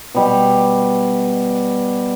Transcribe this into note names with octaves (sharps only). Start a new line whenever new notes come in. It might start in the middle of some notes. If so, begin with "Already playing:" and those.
B2 G3